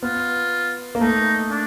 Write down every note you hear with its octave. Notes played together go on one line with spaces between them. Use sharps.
B3 F4
A#3
A3 D#4
D4